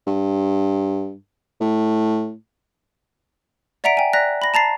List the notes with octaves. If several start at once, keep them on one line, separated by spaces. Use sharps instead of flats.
G2
A2
D5 E5 F#5 A#5 B6 D7
G5 G#5
D5 A#5 F#6 A#6 B6
B5 A#6
A5 A#5 A6 C7